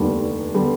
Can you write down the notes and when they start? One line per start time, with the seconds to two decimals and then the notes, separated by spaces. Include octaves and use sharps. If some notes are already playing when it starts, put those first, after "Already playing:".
Already playing: F1 D#2 D3 G3 B3
0.54 D3 G3 B3